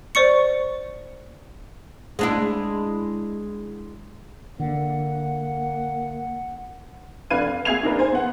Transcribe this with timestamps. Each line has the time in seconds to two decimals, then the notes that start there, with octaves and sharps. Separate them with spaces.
0.15 C5 D5 C#6 C#7
2.19 G#3 D4 E4
4.60 D3 A#3 F#5
7.30 F1 D4 B4 F5 G#6 D#7
7.47 F5
7.65 A#3 G#4 E5 G#6 C7 F7
7.83 D4 D#4 A#4 B4
7.99 C5 G#5
8.12 B3 F#5